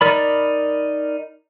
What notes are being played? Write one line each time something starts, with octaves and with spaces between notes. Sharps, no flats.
D#4 A#4 D5 B5